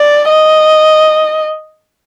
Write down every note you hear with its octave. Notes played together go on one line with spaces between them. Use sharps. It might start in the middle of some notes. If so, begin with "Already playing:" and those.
Already playing: D5
D#5